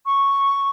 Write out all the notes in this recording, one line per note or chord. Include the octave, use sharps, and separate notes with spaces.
C#6